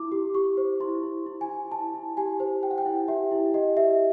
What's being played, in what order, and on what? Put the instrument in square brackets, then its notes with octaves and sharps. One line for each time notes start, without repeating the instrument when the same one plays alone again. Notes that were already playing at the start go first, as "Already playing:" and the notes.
Already playing: [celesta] E4 D6
G4
G4 C#6
C5
E4 C6
E4
E4
G#5
E4
E4 A5
E4
G4 G#5
C5
G4 G5
F#5
G5
E4
G4 E5
E4
G4 D#5
G4 E5